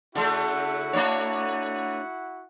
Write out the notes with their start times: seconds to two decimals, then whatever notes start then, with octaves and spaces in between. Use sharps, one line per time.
0.15 C#3 A3 E4 F#4 F#5
0.93 A3 D4 C#5